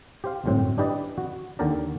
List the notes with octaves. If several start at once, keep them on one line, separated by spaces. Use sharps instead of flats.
G4 C5 F5
G1 F#2 A2 C4
D4 E4 G4 B4 D5 D#5
F#4
D#2 D3 G4 A4 A#4 D5